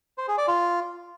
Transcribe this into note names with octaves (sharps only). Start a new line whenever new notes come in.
C5
G#4
D5
F4